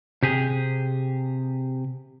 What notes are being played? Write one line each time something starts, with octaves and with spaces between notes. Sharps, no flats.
C3 G4 G#4